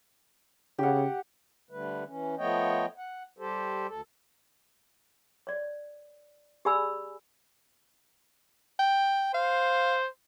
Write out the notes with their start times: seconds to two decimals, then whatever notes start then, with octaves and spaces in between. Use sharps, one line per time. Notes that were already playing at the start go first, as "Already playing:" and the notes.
0.79 C#3 G4 F#5
1.71 D3 G3 A3 B4
2.06 E3 C#4
2.38 F3 A3 B3 C#5 D#5 G5
2.98 F#5
3.39 G3 G4 A4 C5
3.89 D2 A4
5.47 C#5 D5
6.65 G4 G#4 D5 G#5 B5 E6
8.79 G5
9.34 C5 F5